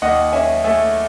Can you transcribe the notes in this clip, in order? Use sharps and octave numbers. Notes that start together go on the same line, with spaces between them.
D#2 D#5 F#5
C#4 E5 G#5
A3 E5 G#5